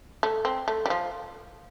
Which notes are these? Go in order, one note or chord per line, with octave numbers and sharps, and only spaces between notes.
A3
C4
A3
G3
F3